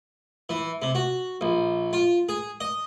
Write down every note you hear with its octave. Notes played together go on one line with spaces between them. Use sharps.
E3
C3
F#4
A#1
F4
G#4
D#5